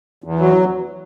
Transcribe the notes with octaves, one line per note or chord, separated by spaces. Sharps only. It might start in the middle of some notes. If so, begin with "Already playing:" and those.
E2
F#3